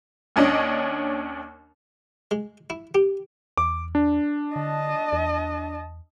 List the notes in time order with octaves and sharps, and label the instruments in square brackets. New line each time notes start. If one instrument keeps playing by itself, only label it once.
[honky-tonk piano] D#2 C#4 D4 D#5
[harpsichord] G#3
E4
G4
[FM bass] E2 [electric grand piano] D6
[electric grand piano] D4
[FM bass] D3 [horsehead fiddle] D#5 A5
[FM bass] E2